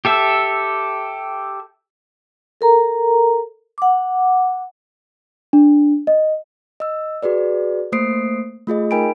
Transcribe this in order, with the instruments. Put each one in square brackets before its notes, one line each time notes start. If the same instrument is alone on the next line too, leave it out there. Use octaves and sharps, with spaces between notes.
[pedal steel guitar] G4 A4 E5
[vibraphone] A4 A#4 A#5
F#5 D6
[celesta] D4
D#5
[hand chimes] D#5 E6
F#4 G#4 B4 D5
A3 A#3 C5 D#6 C7 D7
A3 F4 G#4 D#5
D#4 A#4 G5 G#5 B5 D7